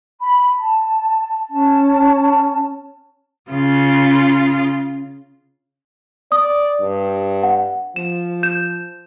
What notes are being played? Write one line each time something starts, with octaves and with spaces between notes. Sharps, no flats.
B5
A5
C#4 A5
C#3 F4
D5 D#6
G2
F#5
F3 E7
G6 E7